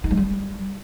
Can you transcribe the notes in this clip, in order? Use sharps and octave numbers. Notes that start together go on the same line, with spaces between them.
D#4
G#3
G3